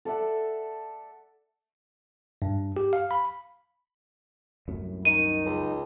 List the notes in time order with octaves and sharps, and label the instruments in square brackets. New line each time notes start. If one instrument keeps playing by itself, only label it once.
[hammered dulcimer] A4 D5 E5 F#5
[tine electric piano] G2
G4
F5
B5
[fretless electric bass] C2 F#2 A2
[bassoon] D#3 [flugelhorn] D#4 [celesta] D#7
[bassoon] C#2